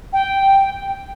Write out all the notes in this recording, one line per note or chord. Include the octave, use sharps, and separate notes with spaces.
G5